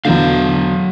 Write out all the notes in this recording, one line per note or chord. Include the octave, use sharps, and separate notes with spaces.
E2 B2 D3 F#3 F5